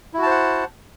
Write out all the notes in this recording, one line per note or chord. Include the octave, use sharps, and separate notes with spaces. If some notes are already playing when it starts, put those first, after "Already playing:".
E4 F#4 C5 F#5 A5